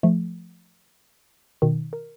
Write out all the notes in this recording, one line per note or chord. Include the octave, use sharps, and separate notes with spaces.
F3 A3
B2 D#3
A#4